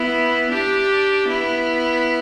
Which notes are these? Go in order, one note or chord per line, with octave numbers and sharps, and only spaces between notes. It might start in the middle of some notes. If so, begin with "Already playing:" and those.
Already playing: B3 E4
D4 G4
B3 E4